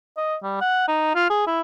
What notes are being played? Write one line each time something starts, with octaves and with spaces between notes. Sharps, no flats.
D#5
G3
F#5
D#4
F4
G#4
E4